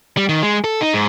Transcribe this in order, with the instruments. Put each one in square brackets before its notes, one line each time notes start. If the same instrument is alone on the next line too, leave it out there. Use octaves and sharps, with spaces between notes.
[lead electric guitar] G3
D#3
G#3
A4
D#4
G#2